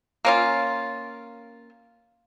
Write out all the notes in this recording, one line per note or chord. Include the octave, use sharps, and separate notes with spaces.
A#3 C#4 F4